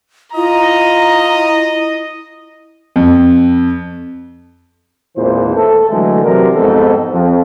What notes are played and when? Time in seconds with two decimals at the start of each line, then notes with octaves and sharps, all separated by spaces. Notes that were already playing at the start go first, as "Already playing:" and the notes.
0.35 E4 F4 D#5 A#5
2.96 F2
5.16 G#1 E2 A#2 E3 C5
5.57 A3 A4
5.91 D3 E3 F#3 G#3 A3
6.23 C3 E3 F#3 G3 D4 A#4
6.55 F2 G#2 B3 D#4 G4 A4
7.12 F2